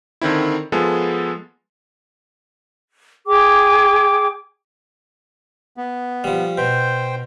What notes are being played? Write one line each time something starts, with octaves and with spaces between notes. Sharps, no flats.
D3 D#3 C4 E4
F3 G#3 B3 G#4 A4
G#4 G5 D6
B3
F3 G3
B2 C5 G5